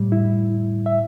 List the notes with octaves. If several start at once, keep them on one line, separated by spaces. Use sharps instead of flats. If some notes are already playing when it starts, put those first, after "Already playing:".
Already playing: A2 G3
E4
E5